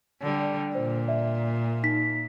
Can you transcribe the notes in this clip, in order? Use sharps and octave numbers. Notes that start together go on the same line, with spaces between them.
D3 G3
A#2 C5
D5 E5
D#4 B6